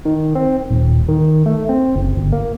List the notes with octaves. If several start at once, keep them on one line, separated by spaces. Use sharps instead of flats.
D#3
C4
D#1
D#3
A3
C4
F#1
G1
A#3